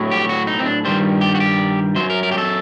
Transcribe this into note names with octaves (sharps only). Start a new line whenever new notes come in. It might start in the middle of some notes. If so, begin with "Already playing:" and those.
Already playing: A2 F#3
G4
F#4
D#4
C4
D4
G2 D#3 G3 C5
G4
F#4
G4
F#2 F#3 C5
A#4
A#4
G4
A4